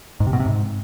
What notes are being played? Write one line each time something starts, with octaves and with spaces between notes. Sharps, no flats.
G#2
C3
B2
C3
G#2